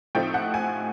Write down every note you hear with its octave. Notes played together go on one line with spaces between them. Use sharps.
A2 F3 A3 C4 D#4 G5
F#5
G#5